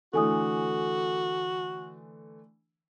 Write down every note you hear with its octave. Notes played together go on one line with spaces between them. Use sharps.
D3 E3 A3 F#4 A4 G#5 D#6